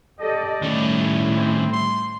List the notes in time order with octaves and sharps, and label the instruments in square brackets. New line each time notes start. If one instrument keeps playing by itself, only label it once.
[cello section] G4 A4 D#5 [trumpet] D5
[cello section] A2 G3 E4 [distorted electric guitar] D#3 C#4
[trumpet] C4
C6